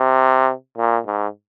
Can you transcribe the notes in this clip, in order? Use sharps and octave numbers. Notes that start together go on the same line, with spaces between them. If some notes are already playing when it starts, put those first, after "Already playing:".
Already playing: C3
A#2
G#2